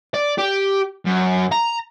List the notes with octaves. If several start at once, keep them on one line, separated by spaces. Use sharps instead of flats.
D5
G4
F#2
A#5